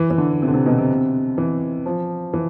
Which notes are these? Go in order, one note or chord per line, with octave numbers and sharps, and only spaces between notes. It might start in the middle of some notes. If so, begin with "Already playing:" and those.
Already playing: E3
E3
D3
C3
D3
C3
B2
C3
E3
F3
E3